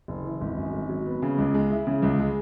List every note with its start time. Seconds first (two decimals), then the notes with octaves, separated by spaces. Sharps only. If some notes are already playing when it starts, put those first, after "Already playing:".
0.08 F#1
0.25 E3
0.41 G#1
0.57 F#2
0.74 G#1
0.89 F#3
1.06 B3
1.22 C#3
1.38 C#2
1.54 G#3
1.70 E4
1.87 C#3
2.02 C#2
2.19 G#3